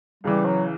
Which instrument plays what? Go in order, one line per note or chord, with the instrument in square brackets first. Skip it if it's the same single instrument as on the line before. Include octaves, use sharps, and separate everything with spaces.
[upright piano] C#2 C#3 E3 [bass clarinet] G3
[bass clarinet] F#3